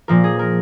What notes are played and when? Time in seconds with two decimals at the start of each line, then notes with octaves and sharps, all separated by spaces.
0.08 A#2 F3 A#4
0.24 G#4
0.39 A#4